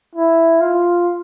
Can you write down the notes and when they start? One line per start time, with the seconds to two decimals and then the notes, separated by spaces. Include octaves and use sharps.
0.15 E4
0.61 F4